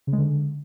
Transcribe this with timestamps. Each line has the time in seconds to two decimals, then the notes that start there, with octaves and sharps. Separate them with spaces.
0.07 C#3
0.13 G#3
0.18 D3